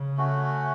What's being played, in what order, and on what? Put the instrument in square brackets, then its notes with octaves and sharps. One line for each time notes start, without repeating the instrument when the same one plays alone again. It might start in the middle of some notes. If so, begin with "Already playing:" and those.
Already playing: [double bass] C#3
[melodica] A3 C#4 F#4